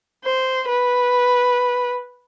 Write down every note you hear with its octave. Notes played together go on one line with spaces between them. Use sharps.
C5
B4